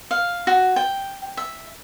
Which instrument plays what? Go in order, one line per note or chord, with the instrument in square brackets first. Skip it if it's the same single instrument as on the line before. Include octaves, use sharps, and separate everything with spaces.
[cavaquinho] F5
F#4
G5
E5